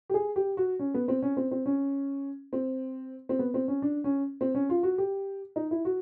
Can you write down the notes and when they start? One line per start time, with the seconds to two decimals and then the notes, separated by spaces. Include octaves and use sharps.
0.10 G4
0.14 G#4
0.36 G4
0.57 F#4
0.79 C#4
0.94 B3
1.08 C4
1.22 C#4
1.37 C4
1.51 C4
1.66 C#4
2.53 C4
3.29 C4
3.39 B3
3.54 C4
3.68 C#4
3.82 D4
4.04 C#4
4.41 C4
4.55 C#4
4.69 F4
4.83 F#4
4.98 G4
5.56 D#4
5.71 E4
5.85 F#4